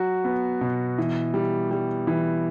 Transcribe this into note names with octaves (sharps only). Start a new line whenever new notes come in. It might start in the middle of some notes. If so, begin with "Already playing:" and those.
Already playing: F#3 F#4
B3
B2
E3
G3
G3
E3